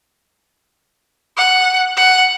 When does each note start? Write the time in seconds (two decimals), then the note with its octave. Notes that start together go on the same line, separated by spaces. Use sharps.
1.37 F#5
1.96 F#5